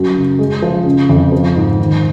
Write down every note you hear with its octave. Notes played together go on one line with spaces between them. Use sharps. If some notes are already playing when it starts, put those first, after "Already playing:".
Already playing: F#2 F#3
C#3
G#3
F3
C#3
F2
F3
G#2
D#3